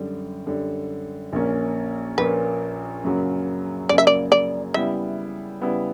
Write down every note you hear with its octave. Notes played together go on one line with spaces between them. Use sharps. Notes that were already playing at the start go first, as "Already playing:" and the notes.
Already playing: F#2 D3 G3
F#2 D3 G3
A#1 A#2 A#3 C#4
A#1 A#2 A#3 C#4 B4
F#2 C#3 F#3 A#3
F#2 C#3 F#3 A#3 D5
E5
D5
D5
C#3 G3 B3 E4 E5
C#3 G3 B3 E4